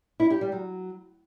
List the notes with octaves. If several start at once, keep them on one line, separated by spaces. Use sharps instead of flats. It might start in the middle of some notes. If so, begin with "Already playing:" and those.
E4
G4
G3
F#3